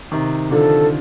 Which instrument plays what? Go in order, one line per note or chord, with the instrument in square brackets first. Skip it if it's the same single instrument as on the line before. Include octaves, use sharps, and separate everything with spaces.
[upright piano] C3 D#3
[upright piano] D3 F3 [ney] A4